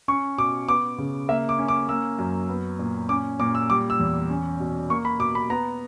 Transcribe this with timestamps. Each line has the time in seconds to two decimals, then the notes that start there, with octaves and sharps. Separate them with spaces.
0.08 C#4 C#6
0.38 B2 D6
0.68 B3 D6
0.98 C#3
1.28 A#3 E5
1.49 D6
1.59 C#4
1.68 D6
1.89 A#3 E6
2.19 F#2
2.49 B3
2.79 A#2
3.09 C#4 D6
3.40 A#2 D6
3.55 E6
3.70 G3 D6
3.90 E6
4.00 E2
4.30 C#4
4.60 B2
4.90 A#3 C#6
5.05 B5
5.19 B2 D6
5.35 B5
5.50 B3 A#5